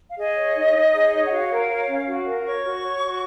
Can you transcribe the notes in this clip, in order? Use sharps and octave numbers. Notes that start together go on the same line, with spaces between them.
F5
G#4 D#5
C#5
D#4
D#4
G#4
C#5
F#5
F#4 F5
A#4
C#5
C#4
F#4
A#4
C#5 C#6
F#4
C#5
F#4